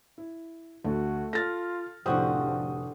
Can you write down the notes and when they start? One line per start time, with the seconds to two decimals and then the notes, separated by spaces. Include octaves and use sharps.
0.18 E4
0.85 D2 A3 F#4
1.33 F4 A4 F6 A6 A#6
2.06 F1 A2 D3 F3 F#4 G4 C5 D#6